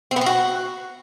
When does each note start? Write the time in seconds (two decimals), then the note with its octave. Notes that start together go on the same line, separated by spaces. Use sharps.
0.11 C4
0.16 B3
0.21 C4
0.26 F#4